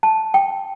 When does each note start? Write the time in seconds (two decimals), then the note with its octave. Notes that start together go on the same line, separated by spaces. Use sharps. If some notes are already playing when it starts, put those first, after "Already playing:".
0.03 A5
0.34 G5